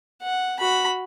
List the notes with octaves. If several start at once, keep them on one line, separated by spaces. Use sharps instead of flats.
F#5
F#4 B5